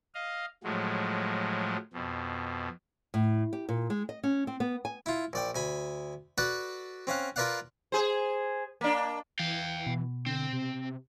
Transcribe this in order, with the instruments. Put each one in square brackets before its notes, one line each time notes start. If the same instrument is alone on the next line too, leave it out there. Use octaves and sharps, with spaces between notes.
[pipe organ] D#5 F5
A2 F3 F#3 G#3
F2 B2
[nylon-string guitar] A2
G4
A#2
G#3
D#5
C#4
C4
B3
G#5
[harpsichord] E4 F4
A#1 D5 G5
D2 G#5 B5
F#4 A4 B4 D5 F#5
C4 C#4 F5 F#5
F4 A#4 B4 D5 F5 F#5
[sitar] G#4 C5
A#3 D4
[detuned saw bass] E3 [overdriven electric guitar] F5 G5
[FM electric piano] B2
[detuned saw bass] D3 [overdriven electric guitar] C4
[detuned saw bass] C3